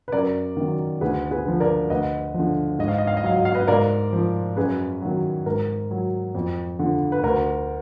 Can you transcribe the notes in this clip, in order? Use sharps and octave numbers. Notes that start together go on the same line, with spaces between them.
B4
F#2 A#4 D5
D#3 F#3
D2 G#4 B4
G#4 B4
D3 F3
A#4 D5
D2 B4 D#5
D3 F3
G#2 D#5
F5
D#5
F5
D#5
F#3 F5
D#5
F5
B4 D#5
G#2 A#4 D5
F3
F#2 G#4 B4
D#3 F#3
G#2 A#4
F#3
F2
D3 F3
B4
D2 A#4